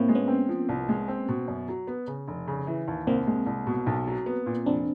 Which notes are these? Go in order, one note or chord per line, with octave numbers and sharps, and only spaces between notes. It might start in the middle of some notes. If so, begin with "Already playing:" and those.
Already playing: A2 A#3 C4
G#3
B3 C#4
C4
F3
C2
G#3
C4
B2
F#2
F#3
B3
C#3
F1
C#3
E3
D#2
C2 A#3 C4
G#3
C2
B2
B1
F#3
B3
A#2
F1 C4 D4